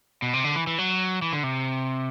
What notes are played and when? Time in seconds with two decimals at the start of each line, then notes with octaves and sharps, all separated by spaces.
0.22 B2
0.33 C3
0.44 D3
0.56 E3
0.67 E3
0.78 F#3
1.22 E3
1.33 D3
1.44 C3